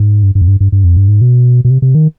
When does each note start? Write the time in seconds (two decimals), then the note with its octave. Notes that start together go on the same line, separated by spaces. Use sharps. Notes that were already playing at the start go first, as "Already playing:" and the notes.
Already playing: G#2
0.23 G2
0.35 G2
0.41 F2
0.48 G2
0.60 G2
0.72 G2
0.84 F2
0.96 G2
1.08 G#2
1.21 B2
1.65 B2
1.70 C3
1.82 C3
1.95 D#3